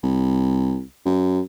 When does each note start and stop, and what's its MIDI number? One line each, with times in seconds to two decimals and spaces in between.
0.03 0.81 36
1.06 1.41 42